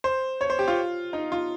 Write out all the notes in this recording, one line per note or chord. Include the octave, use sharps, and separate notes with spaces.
C5
C#5
C5
G4
F4
D#4
F4